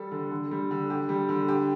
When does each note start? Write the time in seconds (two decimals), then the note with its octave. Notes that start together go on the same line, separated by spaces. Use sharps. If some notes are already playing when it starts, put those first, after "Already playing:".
Already playing: G3 A4
0.12 D3
0.32 D3
0.51 G3
0.71 D3
0.90 G4
1.09 G3
1.29 D3
1.48 G4